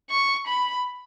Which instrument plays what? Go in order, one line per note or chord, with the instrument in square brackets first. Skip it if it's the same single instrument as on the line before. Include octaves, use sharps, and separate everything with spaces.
[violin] C#6
B5